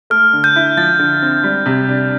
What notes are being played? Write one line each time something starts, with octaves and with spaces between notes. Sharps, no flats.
A3 F6
D3
G6
E4
F3 A6
D3
C4
G3
C3
D4